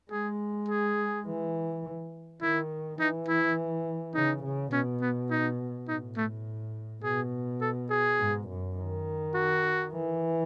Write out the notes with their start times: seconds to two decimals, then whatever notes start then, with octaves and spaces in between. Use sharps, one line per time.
0.11 G#3 G#4
0.69 G#4
1.26 E3
2.42 D#3 E4
2.99 E3 D#4
3.28 E4
4.15 C#3 D#4
4.44 C#3
4.72 B2 C#4
5.02 B3
5.31 D#4
5.88 A2 D#4
6.17 A3
7.03 B2 G#4
7.61 A4
7.90 G#4
8.19 G#2
8.48 F#2
8.77 D#3
9.35 F#4
9.92 E3